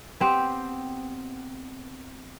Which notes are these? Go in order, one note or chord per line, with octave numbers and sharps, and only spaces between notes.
B3 C4 G4 C5